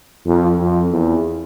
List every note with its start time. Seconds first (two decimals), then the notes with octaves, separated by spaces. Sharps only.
0.26 F2
0.59 F2
0.92 E2